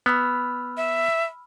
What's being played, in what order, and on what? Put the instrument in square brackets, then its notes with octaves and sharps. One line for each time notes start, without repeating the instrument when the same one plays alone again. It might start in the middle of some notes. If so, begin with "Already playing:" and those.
[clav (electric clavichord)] B3 [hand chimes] B5 E6 F6
[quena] E5